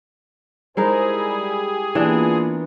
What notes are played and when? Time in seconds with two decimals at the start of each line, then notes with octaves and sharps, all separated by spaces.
0.77 G3 G#3 D#4 E4 G#4 A#4 C5
1.29 G4
1.95 E3 A#3 B3 D4 F4